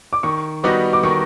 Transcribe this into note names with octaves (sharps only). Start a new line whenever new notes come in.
D6
D#3 C#6
G3 B3 D#4 F#4 D6
D6
D#3 C#6